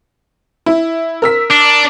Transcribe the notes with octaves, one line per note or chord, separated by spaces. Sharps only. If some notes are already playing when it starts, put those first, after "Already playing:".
E4
A#4 E6 B6
D4